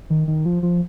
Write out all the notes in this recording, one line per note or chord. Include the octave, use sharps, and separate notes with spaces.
D#3
D#3
F3
F3